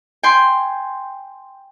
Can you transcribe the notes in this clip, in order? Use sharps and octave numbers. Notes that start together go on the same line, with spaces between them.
G5 G#5 C6